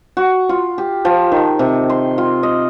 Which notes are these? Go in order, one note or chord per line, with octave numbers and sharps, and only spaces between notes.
F#4
F4
G4
F3
D#3
C3
C6
F4
D#5